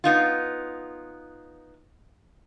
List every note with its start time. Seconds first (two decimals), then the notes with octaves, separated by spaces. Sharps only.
0.04 B3 D#4 F4